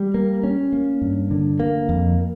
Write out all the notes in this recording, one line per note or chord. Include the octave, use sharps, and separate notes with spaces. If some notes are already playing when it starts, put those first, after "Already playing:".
Already playing: G3
A#3
C#4
A#3
G2
D3
A#3
F2